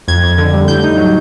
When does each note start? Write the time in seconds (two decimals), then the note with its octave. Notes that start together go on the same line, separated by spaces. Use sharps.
0.08 F2 G#6
0.23 F2
0.38 D3
0.53 G3
0.68 A2 G6
0.84 D#4
0.97 F#3